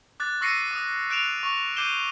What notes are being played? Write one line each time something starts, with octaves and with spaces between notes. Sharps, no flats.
D6 F#6 A6
C#6 E6 A#6 C7 C#7 D#7
D6 D#6
F#6 D7 E7 F7
C#6
D6 G6 C7 D#7 E7 G7